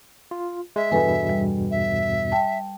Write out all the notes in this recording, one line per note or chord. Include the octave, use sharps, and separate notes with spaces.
F4
G#3 E5
E2 G2 B2 A4 B4 G#5
G3
E5
G5 A5